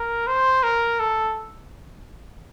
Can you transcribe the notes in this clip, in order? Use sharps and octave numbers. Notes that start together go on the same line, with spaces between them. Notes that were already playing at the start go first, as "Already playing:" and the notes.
Already playing: A#4
C5
A#4
A4